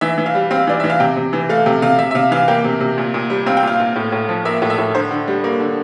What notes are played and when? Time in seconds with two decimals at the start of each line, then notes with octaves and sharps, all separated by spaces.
0.01 E3 E5
0.18 E3
0.26 F5
0.35 G3
0.51 C4 F5
0.67 E3 D5
0.80 E3 E5
0.90 F5
1.00 C3 G5
1.17 C3
1.33 E3
1.49 A3 F5
1.66 C3 G5
1.82 C3 F5
1.99 C3 E5
2.11 E5
2.15 C3 F5
2.31 E3 F5
2.48 A#3 G5
2.64 C3
2.80 C3
2.98 A#2
3.14 A#2
3.30 G3
3.46 C4 F5
3.57 G5
3.63 A#2 F5
3.80 A#2
3.96 A2
4.12 A2
4.29 F3
4.45 A#3 E5
4.62 A2
4.70 E5
4.78 A2
4.95 D3 C5
5.11 D3
5.28 G3
5.44 A#3
5.60 D3